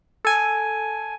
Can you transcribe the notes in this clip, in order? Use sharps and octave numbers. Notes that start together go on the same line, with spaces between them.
A4 G#5